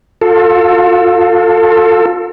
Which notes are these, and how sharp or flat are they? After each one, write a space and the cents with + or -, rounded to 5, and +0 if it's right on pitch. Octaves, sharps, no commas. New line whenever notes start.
F4 +30 A4 +20